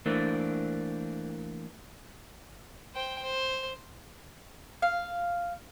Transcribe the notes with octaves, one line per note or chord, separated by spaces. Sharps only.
E3 A3 A#3 C4 D4
C5 G5
C5
F5